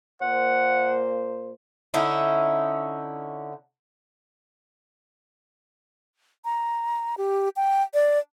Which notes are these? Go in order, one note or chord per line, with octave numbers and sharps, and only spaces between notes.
A#2 A#3 C5 F#5
D3 C#4 D#4 E4
A#5
G4
G5
D5